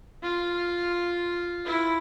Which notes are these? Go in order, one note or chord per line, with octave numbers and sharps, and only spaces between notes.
F4
E4